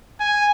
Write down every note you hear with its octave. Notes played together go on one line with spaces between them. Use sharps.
G#5